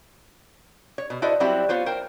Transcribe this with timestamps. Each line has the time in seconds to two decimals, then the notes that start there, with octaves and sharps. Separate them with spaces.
0.98 C#5
1.10 B2
1.22 E4 F#4 A4 C5 D5 D#5
1.40 F#3 G3 C4 E4 F#4 G4
1.69 B3 F4 C5 C#5
1.86 A#4 C5 G5